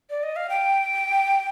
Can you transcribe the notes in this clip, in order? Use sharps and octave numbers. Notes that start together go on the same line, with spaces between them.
D5
D#5
F5
G5